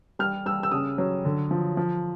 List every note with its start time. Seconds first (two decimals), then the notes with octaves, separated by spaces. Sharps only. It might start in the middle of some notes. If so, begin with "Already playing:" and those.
0.19 G3 F6
0.46 G3 E6
0.63 E6
0.72 C#3 D#6
0.98 F#3
1.25 D3
1.51 F3
1.77 F3